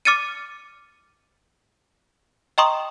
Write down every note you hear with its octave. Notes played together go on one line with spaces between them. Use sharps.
D6 F6 A6 C#7 D#7
D#5 G5 A#5 C6 C#6 D#6